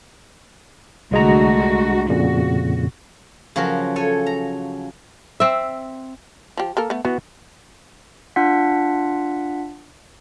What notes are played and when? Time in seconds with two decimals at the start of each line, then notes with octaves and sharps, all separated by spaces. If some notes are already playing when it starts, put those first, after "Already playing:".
1.11 C2 D3 G#3 A3 F#4 A#5
2.09 F2 A#2 C#3 F#4
3.56 C#3 F3 F#3 F#4 A#4
3.96 A4 C#5 G#5
4.26 A#5
5.40 C4 E5
6.57 F3 G4
6.77 A#3 A4 A#4
6.90 A3 B3
7.05 E3 B3 F#4
8.36 D4 F4 F#5 B6